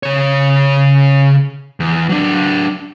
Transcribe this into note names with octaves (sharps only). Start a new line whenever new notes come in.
C#3 C#5
E2
F#3 D4